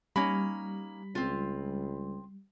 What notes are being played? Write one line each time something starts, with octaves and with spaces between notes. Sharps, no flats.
G3 A#3 C#4 D#4 B5
C#2 C4 F4